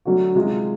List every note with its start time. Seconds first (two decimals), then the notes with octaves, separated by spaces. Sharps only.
0.05 D3 F#3 A3 C#4 F#4
0.35 C3 D#3 G#3 C#4 F4